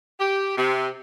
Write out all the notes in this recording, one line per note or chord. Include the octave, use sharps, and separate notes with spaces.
G4
C3